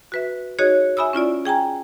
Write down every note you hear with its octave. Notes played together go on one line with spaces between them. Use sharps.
F#4 B4 E5
D#4 F#4 G#4 C#5 D#5
E5 G#5 B5 D#6 E6
C#4 E4 F4 D5
G#4 G5 G#5 A#5